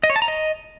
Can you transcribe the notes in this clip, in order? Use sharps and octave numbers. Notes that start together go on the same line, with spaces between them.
D#5
C#5
A5
A#5
D#5